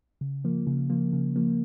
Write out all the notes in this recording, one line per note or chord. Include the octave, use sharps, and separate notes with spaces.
C#3
F3 A#3
C#3
F3 A#3
C#3
F3 A#3